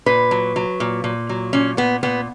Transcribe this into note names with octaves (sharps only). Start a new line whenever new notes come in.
A#2 B4
F#3
F#3
A#2
A#2
F#3
A#2 C#4
A#2 B3
A#2 B3